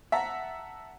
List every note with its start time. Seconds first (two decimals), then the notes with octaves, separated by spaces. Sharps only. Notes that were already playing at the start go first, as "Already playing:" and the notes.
0.12 E5 F#5 A5 A#5